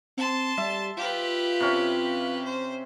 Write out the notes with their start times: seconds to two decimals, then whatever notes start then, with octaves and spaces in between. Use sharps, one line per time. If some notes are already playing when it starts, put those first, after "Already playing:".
0.17 C4 A5 C6
0.58 G3 E5
0.97 F4 G4 B4
1.61 C3 C#4
2.44 C5